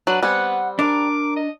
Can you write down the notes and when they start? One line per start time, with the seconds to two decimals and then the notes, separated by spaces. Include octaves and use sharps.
0.07 F#3 D4 B4
0.23 G3 B3 C4 F#5 G#5
0.79 D4 A#4 D6
1.36 D#5